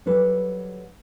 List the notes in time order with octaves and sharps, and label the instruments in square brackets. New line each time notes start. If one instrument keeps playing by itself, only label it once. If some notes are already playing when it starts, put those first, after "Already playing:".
[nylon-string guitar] F#3 G3 A4 B4